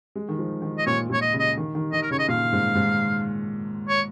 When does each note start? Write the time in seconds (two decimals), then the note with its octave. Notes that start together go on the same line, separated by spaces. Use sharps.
0.15 G#3
0.29 D#3
0.39 F3
0.62 D#3
0.78 D#5
0.87 A#2 C#5
1.10 A#2 C#5
1.21 D#5
1.33 C#3
1.39 D#5
1.57 D#3
1.75 D#3
1.92 D#3 D#5
2.02 A#4
2.11 C#3 C#5
2.19 D#5
2.28 A#2 F5
2.52 G#2
2.75 G#2
3.89 C#5